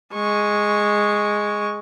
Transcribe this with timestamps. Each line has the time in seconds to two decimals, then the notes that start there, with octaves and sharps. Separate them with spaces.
0.14 G#3 C#6